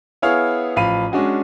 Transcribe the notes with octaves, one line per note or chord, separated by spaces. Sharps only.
B3 E4 G#4 C#5 F5 F6
A1 F3 F5 B5 D#7
G#3 C#4 D4 F#4 G#4